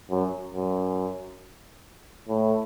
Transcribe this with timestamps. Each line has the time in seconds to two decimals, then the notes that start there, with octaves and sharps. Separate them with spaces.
0.10 F#2
0.54 F#2
2.28 A2